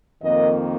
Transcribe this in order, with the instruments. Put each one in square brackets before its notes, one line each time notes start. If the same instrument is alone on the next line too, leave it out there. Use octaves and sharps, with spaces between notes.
[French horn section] F2 D#3 A#3 D#5